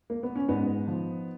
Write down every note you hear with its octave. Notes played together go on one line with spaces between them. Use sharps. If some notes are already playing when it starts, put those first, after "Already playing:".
A#3
B3
C#4
G#2 B3 D#4
F3